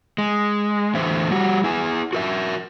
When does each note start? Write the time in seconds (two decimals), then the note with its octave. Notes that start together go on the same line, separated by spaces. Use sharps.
0.18 G#3
0.94 E2 A2 D3 E3 C5 E5
1.31 G3 F#4
1.64 E4 G#4
2.13 F#4 A#4 E5